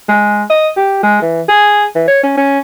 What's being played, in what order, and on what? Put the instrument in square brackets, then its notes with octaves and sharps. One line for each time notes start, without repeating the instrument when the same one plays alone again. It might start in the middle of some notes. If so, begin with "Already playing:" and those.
[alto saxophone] G#3
D#5
G4
G#3
E3
G#4
E3
C#5
C#4
C#4